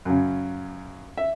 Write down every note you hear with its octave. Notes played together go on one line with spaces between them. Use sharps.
F#2 C#3
E5